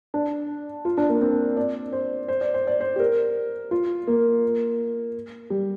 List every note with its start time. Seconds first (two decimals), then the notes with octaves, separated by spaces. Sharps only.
0.14 D4
0.85 F4
0.97 D4
1.09 A#3
1.21 C4
1.57 D5
1.93 C5
2.28 C5
2.41 D5
2.54 C5
2.67 D5
2.80 C5
2.96 G4
3.00 A#4
3.71 F4
4.07 A#3
5.50 G3